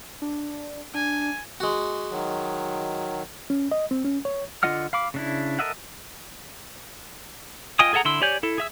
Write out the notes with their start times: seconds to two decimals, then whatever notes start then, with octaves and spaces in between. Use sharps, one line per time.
0.22 D4
0.94 D4 G#5
1.60 G#3 F#4
2.11 D#3 F#3
3.50 C#4
3.71 D#5
3.91 C4
4.04 C#4
4.25 C#5
4.63 D3 F4 D#5 F#5 F6
4.93 F5 B5 D6
5.14 C#3 D4 E4
5.59 A4 A#4 D#5 E5 F#5
7.79 F4 D#5 G5 G#5 D#6
7.93 G#4 A4 E5 F#5 A#5
8.05 D3 E4 C6 E6
8.21 G4 C#5 D5 G#5 G6
8.43 E4 A4
8.58 G#4 E5 E6